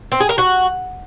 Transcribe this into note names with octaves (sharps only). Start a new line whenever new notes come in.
C4
G#4
A#4
F#4